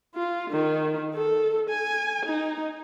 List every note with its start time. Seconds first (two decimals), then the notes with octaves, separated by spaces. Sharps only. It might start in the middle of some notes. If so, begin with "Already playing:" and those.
0.15 F4
0.51 D#3
1.15 A4
1.70 G#5
2.26 D#4